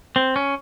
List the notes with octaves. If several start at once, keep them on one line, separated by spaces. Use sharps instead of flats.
C4
C#4